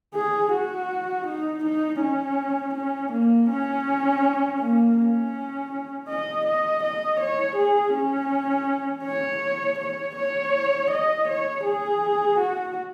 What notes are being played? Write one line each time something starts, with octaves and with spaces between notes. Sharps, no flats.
G#4
F#4
D#4
D#4
C#4
C#4
A#3
C#4
A#3
C#4
D#5
D#5
D#5
C#5
G#4
C#4
C#5
C#5
C#5
D#5
C#5
G#4
F#4